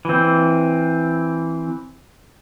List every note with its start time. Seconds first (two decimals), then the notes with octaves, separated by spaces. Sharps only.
0.05 E3 C4